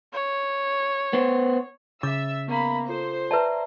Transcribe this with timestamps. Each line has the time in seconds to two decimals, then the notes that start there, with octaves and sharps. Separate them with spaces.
0.13 C#5
1.13 B3 C5
2.03 C#3 E5 D6 E6 A6
2.48 A#3 B3 B5
2.89 F4 A4 C5
3.31 B4 D5 E5 A5 A#5